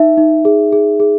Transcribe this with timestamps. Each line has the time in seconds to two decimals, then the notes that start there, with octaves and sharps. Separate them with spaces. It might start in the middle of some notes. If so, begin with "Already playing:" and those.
Already playing: D#4 E5
0.18 D#4
0.45 G#4
0.72 G#4
1.00 G#4